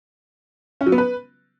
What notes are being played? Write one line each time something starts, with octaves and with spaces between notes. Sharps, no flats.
C#4
F#3
B3
B4